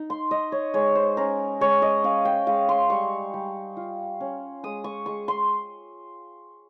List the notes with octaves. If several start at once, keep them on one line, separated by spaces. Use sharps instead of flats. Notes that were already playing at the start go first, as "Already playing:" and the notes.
Already playing: D#4
C6
D#4 D#5
C#5
G#3 C#5
C5
C#4 A#4
G#3 C#5
D#5
C#4 F5
G5
G#3 F5
C6
G3 C#6
G3
F4
C#4
G#3 D#6
C#6
G#3 C#6
C6